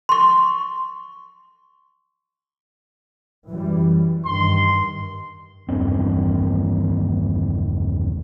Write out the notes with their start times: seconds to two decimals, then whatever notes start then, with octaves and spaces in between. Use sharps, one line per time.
0.09 C6 C#6
3.47 F#2 E3 G3
4.26 G2 D#3 C6
5.69 E1 E2 G2 C4